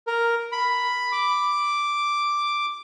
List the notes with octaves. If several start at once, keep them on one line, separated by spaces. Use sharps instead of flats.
A#4
B5
D6